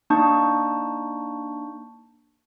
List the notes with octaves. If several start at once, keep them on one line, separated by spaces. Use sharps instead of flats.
A#3 D4 D#4 A5 C#6 G6